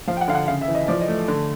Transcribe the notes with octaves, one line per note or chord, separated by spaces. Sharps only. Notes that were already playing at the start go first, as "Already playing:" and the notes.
F3 F5
G5
F#5
D3 F5
F#5
C#3 F5
E5
E3
D#5
F3 D5
D#5
A3
D3